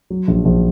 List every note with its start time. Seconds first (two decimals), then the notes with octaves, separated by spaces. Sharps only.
0.10 F#3
0.28 A#1
0.45 A#1